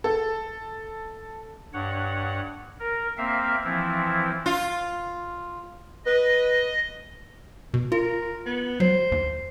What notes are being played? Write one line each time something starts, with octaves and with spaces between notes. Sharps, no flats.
A4
G2 C#5 F#5
A#4
A#3 C4 E5 F5
E3 F3 C4 E4
F4
B4 D#5
B2
F4 A#4
B3
F#3 C5
D#2